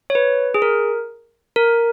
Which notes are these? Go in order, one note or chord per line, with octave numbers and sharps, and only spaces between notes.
C#5
B4
G#4
A#4
A#4